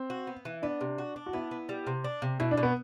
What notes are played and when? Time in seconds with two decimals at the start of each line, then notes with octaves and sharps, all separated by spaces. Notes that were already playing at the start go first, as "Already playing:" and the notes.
Already playing: C4
0.10 F#4
0.27 B3
0.45 E3
0.62 B3 D4
0.81 C3
0.98 F#4
1.16 D4
1.26 F#4
1.33 B3 E4
1.51 B3
1.69 G3
1.87 C3
2.04 D4
2.22 C3
2.40 B2 E4
2.51 D4
2.57 B2
2.63 B3